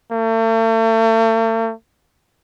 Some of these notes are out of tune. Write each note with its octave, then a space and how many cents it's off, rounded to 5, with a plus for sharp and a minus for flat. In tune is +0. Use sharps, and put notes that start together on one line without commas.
A3 +40